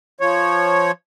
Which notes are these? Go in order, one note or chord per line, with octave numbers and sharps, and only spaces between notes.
F3 C#5